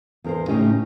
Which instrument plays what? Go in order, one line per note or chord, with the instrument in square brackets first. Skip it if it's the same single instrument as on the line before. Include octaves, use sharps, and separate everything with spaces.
[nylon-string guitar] E2 A#4 C5
A2 C#3 C#4 D#4 G4 D#5